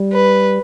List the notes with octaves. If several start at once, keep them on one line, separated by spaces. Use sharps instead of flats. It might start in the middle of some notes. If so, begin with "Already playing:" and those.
Already playing: G3
B4